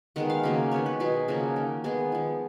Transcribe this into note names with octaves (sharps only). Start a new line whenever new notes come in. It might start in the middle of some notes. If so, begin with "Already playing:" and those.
D#3 G#3 B3 F#5
F5
C#3 F#3 A#3
D#3 G#3 B3 C#5
B4
B2 F#3 B3 G#4
C#3 F3 A#3 F#4
D#3 A#3
D#3 G#3 B3 G#4
F3 B3